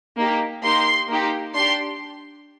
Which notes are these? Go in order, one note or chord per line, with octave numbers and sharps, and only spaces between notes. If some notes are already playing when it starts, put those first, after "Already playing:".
A#3 D#4 G4
A#3 D#4 G4 C6
A#3 D#4 G4
D4 G4 C6